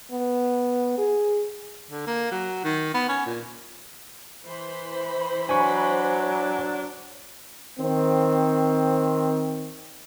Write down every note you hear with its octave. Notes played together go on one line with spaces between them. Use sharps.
B3
G#4
D3
A#3
F#3
D#3
B3
C#4
A#2
E3 C5 B5
F#3 D4 G#5 C#6
D#3 C4